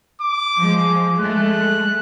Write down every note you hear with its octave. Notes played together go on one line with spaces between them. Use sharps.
D6
F3 G#3
G#3 A3 F#6